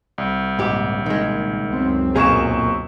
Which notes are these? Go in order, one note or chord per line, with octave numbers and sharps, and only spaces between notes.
C2
A#1 G#2 C#3 G4
D#3 G#3
C#2 F#2 C4
B1 A#2 A#3 G#4 C#6 E7